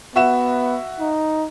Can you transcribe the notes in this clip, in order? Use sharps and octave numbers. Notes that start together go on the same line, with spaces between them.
B3 F#4 E5 E7
D#4